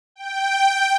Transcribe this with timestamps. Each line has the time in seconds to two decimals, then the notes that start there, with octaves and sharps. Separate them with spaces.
0.16 G5